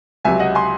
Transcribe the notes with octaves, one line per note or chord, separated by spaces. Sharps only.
C#2 C3 F#3 E5 G#5
D#5 F#5
G#5 C6